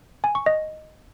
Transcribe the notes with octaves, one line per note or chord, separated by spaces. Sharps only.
G#5
C#6
D#5